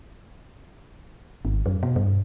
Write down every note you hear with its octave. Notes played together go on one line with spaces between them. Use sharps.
G#1
F#2
B2
G2